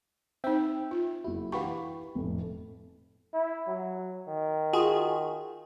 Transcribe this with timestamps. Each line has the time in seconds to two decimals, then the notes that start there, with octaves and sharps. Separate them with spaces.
0.44 C4 D#4 C5 E5 G5
0.91 F4
1.24 F#1 E4 F#4
1.52 E3 G4 B4 F5 F#5 B5 C#6
2.15 F1 A2
3.34 E4
3.68 F#3
4.28 D#3
4.73 F4 F#4 G#4